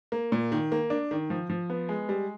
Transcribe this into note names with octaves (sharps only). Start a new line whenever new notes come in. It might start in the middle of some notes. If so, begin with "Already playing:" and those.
A#3
A#2
D#3
A#3
D4
D#3
F3
F3
B3
G#3
G3